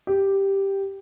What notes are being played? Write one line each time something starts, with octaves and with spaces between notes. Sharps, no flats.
G4